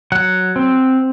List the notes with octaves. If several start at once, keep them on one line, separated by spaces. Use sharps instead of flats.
F#3 F#5
C4